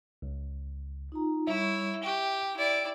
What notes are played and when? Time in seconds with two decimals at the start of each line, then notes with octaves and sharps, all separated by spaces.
0.22 C#2
1.12 D#4 F4 A#5
1.47 G3 E4 C#5 E5 C#6
2.04 G4 G5
2.57 E4 D5